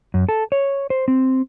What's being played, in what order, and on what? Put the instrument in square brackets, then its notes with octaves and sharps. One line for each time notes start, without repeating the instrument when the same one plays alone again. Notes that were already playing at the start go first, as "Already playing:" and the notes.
[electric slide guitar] F#2
A4
C#5
C5
C4